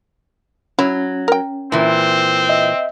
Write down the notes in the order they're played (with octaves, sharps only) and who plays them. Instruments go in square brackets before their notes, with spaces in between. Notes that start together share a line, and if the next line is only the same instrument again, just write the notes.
[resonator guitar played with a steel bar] F#3 [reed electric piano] C#4 [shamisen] E4
[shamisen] A#4 G5
[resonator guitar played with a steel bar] A#2 E3 [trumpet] C4
[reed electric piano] D#5 E5